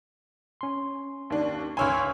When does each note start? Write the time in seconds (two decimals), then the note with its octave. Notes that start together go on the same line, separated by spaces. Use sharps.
0.61 C#4 C6
1.30 D#2 D4
1.77 C#2 C#5 G#5 C6 E6 F6